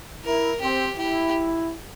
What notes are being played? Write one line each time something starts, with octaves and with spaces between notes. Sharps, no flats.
E4 A#4
C4 G4
E4 G4